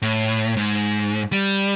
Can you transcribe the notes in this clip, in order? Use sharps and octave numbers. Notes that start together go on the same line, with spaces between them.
A2
G#2
G3